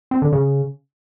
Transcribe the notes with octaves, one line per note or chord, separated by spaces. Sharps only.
C4
D3
C#3